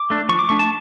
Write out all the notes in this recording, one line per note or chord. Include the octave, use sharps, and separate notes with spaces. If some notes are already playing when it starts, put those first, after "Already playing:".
Already playing: D6
A3 D4
F3 C#6
D6
A3 D4 C#6
A5